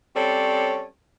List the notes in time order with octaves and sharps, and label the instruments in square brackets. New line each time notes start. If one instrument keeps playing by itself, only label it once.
[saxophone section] G3 C4 C#4 A4 C#5 D5